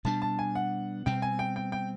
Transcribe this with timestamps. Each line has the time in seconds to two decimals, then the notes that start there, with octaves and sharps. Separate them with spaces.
0.05 B2 G3 B3 D4 A5
0.22 A5
0.39 G#5
0.55 F#5
1.06 B2 G3 C4 G5
1.22 G#5
1.39 G5
1.56 G5
1.72 G5